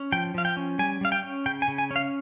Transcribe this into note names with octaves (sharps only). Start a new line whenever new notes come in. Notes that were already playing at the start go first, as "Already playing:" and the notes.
Already playing: C#4
F3 G5
F3 F5
G5
C#4
G3 G#5
G3 F5
G5
C#4
C#3 G5
G#5
C#3
G#5
C#4
F5